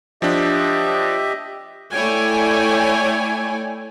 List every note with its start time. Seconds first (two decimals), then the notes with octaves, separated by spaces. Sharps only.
0.22 F3 D4 G4 D#5 E5
1.93 A3 E4 C#5 D5 G5 G#5